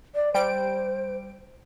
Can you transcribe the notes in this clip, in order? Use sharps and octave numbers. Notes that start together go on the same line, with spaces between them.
D5
G3 C5 D7